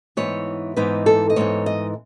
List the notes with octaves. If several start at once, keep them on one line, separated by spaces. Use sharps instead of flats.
G#2 E3 B3 D#4 C#5
G#2 E3 B3 D#4 B4
A4
D#5
G#2 E3 B3 D#4 C#5
D#5